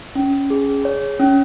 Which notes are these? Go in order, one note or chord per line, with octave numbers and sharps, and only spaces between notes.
C#4
G#4
C#5
C#4